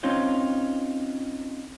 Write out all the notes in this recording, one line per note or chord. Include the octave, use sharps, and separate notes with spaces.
C4 C#4 D#4 F4 C5 C#5